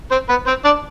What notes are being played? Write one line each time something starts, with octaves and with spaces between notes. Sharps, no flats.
C4 C5
B3 B4
C4 C5
D4 D5